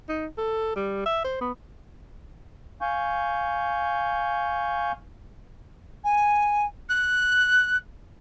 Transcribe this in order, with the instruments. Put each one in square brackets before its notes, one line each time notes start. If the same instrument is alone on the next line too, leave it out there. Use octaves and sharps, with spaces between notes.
[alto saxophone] D#4
A4
G3
E5
C5
B3
[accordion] F5 G#5 C#6 G6
[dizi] G#5
F#6